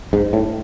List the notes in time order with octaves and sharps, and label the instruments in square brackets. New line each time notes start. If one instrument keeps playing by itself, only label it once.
[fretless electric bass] G#2
A2